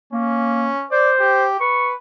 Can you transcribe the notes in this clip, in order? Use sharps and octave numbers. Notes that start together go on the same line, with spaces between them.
A#3 C#4
C5 D5
G4
B4 C#6